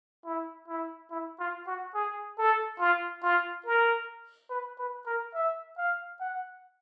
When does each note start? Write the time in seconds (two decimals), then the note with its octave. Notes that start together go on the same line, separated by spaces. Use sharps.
0.25 E4
0.68 E4
1.11 E4
1.39 F4
1.67 F#4
1.95 G#4
2.38 A4
2.80 F4
3.23 F4
3.66 A#4
4.50 B4
4.79 B4
5.06 A#4
5.35 E5
5.78 F5
6.20 F#5